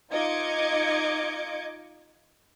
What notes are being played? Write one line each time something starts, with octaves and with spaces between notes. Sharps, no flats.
D#4 F4 D#5 D6 G#6 C#7